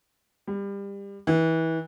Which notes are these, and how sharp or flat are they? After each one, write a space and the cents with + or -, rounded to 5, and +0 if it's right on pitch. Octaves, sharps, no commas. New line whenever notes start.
G3 +25
E3 -25